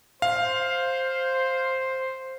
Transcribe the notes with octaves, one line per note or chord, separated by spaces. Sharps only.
C5 F5